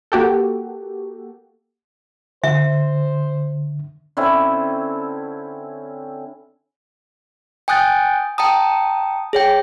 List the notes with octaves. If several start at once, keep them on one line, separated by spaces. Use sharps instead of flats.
A#3 F#4 G4 A4
D3 C5 E5
D3 C4 C#4 E4
G5 G#5 D#6 F#6 G6 A6
G5 A5 A#5 D#6
G#4 C#5 G5